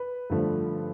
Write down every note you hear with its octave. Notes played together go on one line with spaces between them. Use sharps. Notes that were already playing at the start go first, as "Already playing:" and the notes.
Already playing: B4
G2 D3 F3 A3